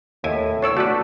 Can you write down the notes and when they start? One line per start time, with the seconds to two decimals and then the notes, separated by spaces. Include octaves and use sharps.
0.24 D#2 A2 E4 G#5
0.62 D4 A4 C#5 D5 E6
0.77 A3 D4 F#4 B4 D6